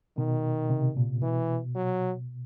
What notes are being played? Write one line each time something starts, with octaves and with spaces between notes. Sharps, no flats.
B2 D#3
C3
A#2
B2 E3
F#3